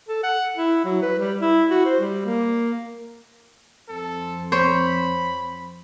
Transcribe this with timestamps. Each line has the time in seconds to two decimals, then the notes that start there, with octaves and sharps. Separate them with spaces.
0.09 A4
0.23 F#5
0.57 E4
0.85 F#3
1.02 B4
1.19 G3
1.41 E4
1.70 F#4
1.85 C5
1.99 G3
2.25 A#3
3.88 F2 C4 A4
4.52 C5 C#5 B5